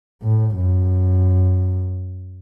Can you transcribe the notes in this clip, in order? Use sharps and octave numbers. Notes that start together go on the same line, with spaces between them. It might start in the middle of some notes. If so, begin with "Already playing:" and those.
A2
F#2